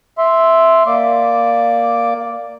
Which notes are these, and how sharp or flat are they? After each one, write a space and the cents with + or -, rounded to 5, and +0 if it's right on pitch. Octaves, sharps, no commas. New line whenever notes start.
E5 +0 C6 +0
A#3 +0 D5 +0 D6 +0